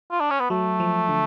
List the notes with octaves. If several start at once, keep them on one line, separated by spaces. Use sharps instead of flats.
F4
D4
C#4
B3
F#3 A3
F3
D3